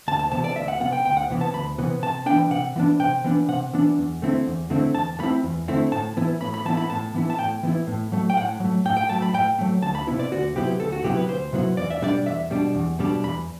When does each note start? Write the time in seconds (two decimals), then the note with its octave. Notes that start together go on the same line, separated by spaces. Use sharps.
0.08 D2 A5
0.19 A5
0.31 C3 E3 B3 A5
0.44 D5
0.56 D2 E5
0.68 F#5
0.80 C3 E3 B3 F#5
0.92 G5
1.05 D2 G5
1.17 F#5
1.30 C3 E3 B3
1.41 A5
1.54 D2 B5
1.78 C3 E3 B3
2.03 C3 A5
2.26 E3 B3 D4 G5
2.50 C3 F#5
2.76 E3 B3 D4
3.00 C3 G5
3.24 E3 B3 D4
3.48 C3 F#5
3.73 E3 B3 D4
3.98 E2
4.22 D3 A3 C4 E4
4.47 E2
4.70 D3 A3 C4 E4
4.95 E2 A5
5.19 D3 A3 C4 E4 B5
5.43 E2
5.68 D3 A3 C4 E4
5.92 A2 A5
6.17 E3 B3 E4
6.41 A2 B5
6.54 B5
6.65 E3 B3 E4 A5
6.77 B5
6.90 A2 A5
7.14 E3 B3 E4
7.30 A5
7.39 A2 G5
7.63 E3 B3 E4
7.87 A2
8.12 F#3 A3
8.30 G5
8.37 A2 F#5
8.60 F#3 A3
8.85 A2 G5
8.97 G5
9.09 F#3 A3 A5
9.22 B5
9.33 A2 G5
9.59 F#3 A3
9.82 D2 A5
9.95 B5
10.07 C3 F#3 B3 E4
10.19 D5
10.32 D2 F#4
10.56 C3 F#3 B3 E4 G4
10.80 D2 A4
10.92 F#4
11.04 C3 F#3 B3 E4 G4
11.17 B4
11.29 D2 C5
11.53 C3 F#3 B3 E4
11.77 E2 D5
11.90 E5
12.01 B2 G3 D4 D5
12.26 E2 E5
12.50 B2 G3 D4
12.75 E2
12.99 B2 G3 D4
13.24 E2 B5